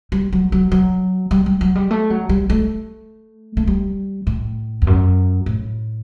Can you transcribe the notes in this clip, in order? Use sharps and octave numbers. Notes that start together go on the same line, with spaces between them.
G3
F#3
F#3
F#3
G3
G3
F#3
G3
A3
F#3
G3
A3
A3
G3
A2
E2
F#2
A2